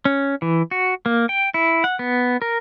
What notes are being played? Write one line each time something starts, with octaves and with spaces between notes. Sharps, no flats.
C#4
E3
F#4
A#3
G5
E4
F#5
B3
A#4